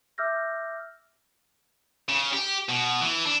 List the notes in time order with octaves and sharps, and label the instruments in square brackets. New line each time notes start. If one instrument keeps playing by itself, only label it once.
[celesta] E5 D6 E6 F6 G6 A#6
[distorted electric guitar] C#3
G4
B2
E3
D4